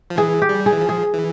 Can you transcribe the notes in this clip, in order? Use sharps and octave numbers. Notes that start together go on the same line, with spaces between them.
F3
E3 G#4
G4
G3
G#4
E3
F3
G#4
E3